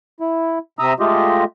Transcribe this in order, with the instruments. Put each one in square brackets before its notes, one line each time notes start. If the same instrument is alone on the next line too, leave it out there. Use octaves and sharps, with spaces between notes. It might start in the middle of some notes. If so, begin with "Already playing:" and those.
[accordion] E4
C3 E5 A#5 D#6 E6
G#3 A3 F4 G4 D#5